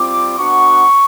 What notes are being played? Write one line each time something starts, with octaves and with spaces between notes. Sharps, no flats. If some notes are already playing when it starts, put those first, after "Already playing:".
Already playing: G3 C4 F4 D6
B3 D4 F#4 C#6